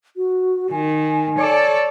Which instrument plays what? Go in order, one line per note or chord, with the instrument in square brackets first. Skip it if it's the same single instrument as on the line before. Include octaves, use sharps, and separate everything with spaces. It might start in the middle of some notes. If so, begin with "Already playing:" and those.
[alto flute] F#4
[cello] D#3 [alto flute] G#5
[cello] A4 [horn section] C#5 D5